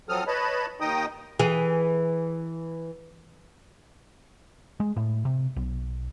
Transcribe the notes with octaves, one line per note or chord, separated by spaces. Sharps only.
F3 F#3 C4 A4 D#6 F6
B4 C#5 D#5 A5 B5
D#2 D#3 D#4 D#5 G5 D#6
E3 G#4
G#3
A2
C3
B1